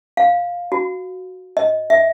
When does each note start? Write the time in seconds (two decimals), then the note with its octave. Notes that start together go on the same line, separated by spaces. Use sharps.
0.17 F5
0.72 F#4
1.57 D#5
1.90 E5